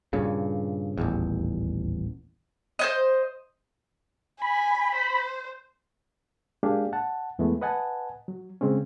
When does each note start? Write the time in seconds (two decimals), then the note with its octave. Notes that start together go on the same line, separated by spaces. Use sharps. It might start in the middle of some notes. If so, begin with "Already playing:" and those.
0.13 G2 A#2 C#3
0.98 D#1 A1 E2
2.79 C5 C#5 D#5
4.42 G#5 B5
4.95 C5
6.63 G#3 A#3 D4 G4 G#4 F5
6.93 F#5 A5
7.39 E2 E3 G#3 A3 B3
7.61 B4 D#5 F#5 G#5 A5
8.28 F#3
8.61 C#3 G#3 C4 C#4